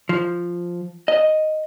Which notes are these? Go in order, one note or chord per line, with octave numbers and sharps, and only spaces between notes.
F3
D#5